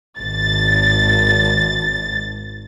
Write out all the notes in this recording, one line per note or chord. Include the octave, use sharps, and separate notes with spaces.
G#1 A6